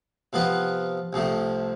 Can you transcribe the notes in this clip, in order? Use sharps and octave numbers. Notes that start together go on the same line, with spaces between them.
C3 F3 B3 F4 B4
C2 C3 F3 A3